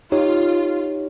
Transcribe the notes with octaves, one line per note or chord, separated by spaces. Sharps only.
D#4 F4 G4 C#5